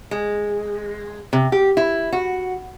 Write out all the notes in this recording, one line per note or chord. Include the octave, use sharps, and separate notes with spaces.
G#3
C3
G4
E4
F#4